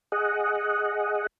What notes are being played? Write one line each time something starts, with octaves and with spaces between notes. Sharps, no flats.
G#4 D#5 F#5